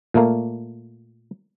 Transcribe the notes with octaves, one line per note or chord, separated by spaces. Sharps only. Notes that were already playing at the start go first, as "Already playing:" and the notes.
A#2 A3 A#3